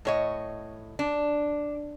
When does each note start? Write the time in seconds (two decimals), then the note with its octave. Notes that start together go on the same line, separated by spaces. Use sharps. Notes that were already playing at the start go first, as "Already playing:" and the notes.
0.05 A2 C#5 D#5
0.99 D4